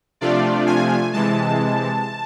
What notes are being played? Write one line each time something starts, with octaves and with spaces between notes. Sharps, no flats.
C3 F3 A3 D4 F4 D5
G#5
C3 E3 G#3 A5